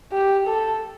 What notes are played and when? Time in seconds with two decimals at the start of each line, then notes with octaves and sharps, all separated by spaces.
0.12 G4
0.47 A4